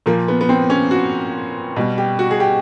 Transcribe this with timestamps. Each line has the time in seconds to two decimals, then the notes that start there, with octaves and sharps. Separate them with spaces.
0.06 A#2 F3 A#3
0.28 B3
0.41 B3
0.49 C4
0.70 C#4
0.91 F#4
1.76 B2 G3
1.98 G4
2.19 F#4
2.31 G#4
2.40 G4